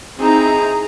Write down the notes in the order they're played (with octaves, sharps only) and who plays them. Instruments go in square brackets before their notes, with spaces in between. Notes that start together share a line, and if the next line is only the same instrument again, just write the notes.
[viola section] C4 D#4 E4 [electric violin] G#4 A#5